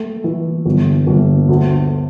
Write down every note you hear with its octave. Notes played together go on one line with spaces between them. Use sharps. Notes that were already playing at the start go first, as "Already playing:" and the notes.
Already playing: A3
E3
G1
G1
D2